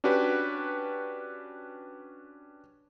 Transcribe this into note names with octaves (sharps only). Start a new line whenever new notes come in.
C#4 D4 F#4 G4 B4